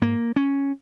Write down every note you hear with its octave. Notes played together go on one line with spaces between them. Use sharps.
G#2 A#3
C#4